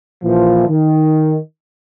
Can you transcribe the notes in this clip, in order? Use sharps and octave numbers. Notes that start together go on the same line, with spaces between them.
A#2 E3 F3
D#3